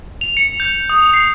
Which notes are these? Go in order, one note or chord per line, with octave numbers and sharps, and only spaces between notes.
F7
C#7
G6
D#6
C7